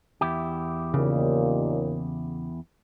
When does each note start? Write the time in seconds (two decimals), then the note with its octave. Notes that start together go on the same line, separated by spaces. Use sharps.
0.21 E2 E4 G4
0.94 D#2 A#2 C#3